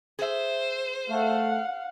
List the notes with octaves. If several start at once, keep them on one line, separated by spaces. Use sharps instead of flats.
G#4 C5 E5
A3 F5 F#5